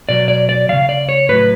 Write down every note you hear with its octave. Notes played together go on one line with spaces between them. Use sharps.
B2 F#3 D5
D5
D5
C#3 F3 F5
D5
C#5
A2 F#3 B4